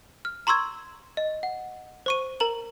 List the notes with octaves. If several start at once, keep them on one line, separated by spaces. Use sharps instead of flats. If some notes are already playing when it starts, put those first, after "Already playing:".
F6
A#5 C6 C#6 E6 G#6
D#5
F#5
C5 C#6 D#7
A#4 A#5 F#7